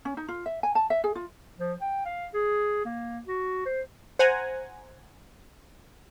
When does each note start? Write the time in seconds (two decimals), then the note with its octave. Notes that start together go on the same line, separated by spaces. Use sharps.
0.05 C#4
0.17 D#4
0.28 F4
0.46 E5
0.63 G#5
0.75 A5
0.90 E5
1.04 G#4
1.15 F4
1.59 F3
1.81 G5
2.05 F5
2.33 G#4
2.85 A#3
3.27 F#4
3.66 C5
4.19 C5 F#5 G#5 A#5